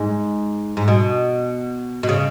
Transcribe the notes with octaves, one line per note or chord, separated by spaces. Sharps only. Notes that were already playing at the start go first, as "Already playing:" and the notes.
Already playing: G#2
G#2
B2
B2
C#3